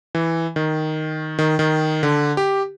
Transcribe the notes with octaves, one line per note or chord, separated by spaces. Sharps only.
E3
D#3
D#3
D#3
D3
G4